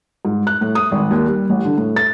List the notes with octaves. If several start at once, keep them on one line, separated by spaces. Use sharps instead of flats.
G#2
F#6
A2
D#6
G#1
D#2
G3
A1
D3
A2
A6